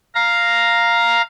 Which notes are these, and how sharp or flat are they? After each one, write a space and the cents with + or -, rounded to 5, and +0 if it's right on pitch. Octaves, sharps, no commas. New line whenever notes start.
F5 +0 A#5 +0